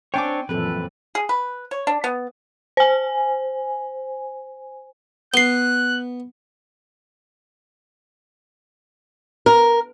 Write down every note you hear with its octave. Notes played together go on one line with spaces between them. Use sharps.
C4 D4 C#5 G5 G#5 D6
F#2 A#2 E3 F3 C4 A4 B4
G#4
B4
C#5
D4
B3
C5 G#5
B3 F#6 C7 G7
A#4